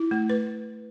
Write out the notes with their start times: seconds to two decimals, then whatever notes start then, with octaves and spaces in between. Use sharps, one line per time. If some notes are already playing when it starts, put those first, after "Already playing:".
Already playing: E4
0.11 A3
0.30 B4